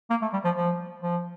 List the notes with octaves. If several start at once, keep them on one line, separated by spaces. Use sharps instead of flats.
A#3
A3
G3
F3
F3
F3